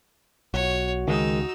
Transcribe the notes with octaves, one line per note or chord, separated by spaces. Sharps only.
B1 F#4 C#5
C#2 D#3 G#3 D#4 E6